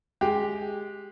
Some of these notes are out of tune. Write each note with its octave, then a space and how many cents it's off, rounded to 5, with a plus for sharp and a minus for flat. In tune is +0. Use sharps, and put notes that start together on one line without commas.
G#3 +0 G4 +0